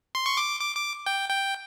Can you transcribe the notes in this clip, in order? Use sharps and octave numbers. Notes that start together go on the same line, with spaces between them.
C6
C#6
D6
D6
D6
G5
G5